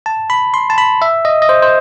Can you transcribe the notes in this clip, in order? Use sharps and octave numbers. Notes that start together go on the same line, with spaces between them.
A5
B5
C6
A5
B5
E5
D#5
D#5
C5
C5